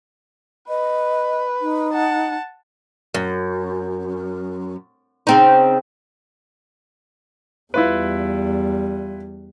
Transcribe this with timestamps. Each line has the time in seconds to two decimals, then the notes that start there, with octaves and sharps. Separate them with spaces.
0.69 B4 D#5
1.61 D#4
1.93 F#5 A5
3.14 F#2
5.27 C#3 C4 D#4
7.74 E2 G3 E4 F4 B4